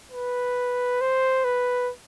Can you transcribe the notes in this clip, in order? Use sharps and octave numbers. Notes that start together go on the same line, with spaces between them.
B4
C5
B4